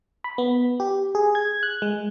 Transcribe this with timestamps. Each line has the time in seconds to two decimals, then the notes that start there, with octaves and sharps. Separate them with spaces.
0.24 B5
0.38 B3
0.80 G4
1.15 G#4
1.35 G#6
1.63 F#6
1.82 G#3